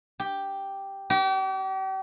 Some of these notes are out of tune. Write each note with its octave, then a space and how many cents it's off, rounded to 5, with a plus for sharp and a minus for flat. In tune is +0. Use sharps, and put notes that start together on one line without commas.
G4 +0
G4 -40